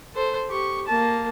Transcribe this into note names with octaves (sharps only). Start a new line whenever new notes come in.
A4 C5
G4 C#6
A#3 A5